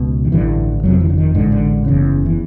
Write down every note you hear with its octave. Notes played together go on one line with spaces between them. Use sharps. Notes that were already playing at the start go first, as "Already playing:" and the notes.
Already playing: C#2 B2
D#3
A1 G2 D3 E3
G1 F2 C3 F#3
E3
D3
D#3
A1 G#2 D3
D3
F#1 E2 C#3
E3